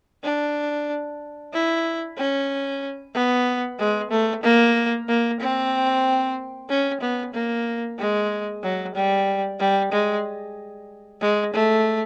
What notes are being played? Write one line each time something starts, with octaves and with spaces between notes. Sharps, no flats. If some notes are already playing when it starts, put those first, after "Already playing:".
D4
E4
C#4
B3
G#3
A3
A#3
A#3
C4
C#4
B3
A#3
G#3
F#3
G3
G3
G#3
G#3
A3